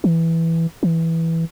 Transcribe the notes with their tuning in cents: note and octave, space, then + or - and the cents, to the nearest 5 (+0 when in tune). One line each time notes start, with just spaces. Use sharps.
E3 +0
E3 -5